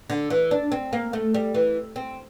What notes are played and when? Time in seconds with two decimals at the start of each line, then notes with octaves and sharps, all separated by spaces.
0.10 D3
0.30 E3
0.51 D4
0.72 C4
0.93 A#3
1.13 A3
1.34 G3
1.54 E3
1.96 C4